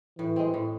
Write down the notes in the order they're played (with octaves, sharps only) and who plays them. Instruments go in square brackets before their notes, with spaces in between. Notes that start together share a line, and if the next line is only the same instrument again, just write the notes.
[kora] A2 [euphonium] E3
[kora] G#3 C4
A2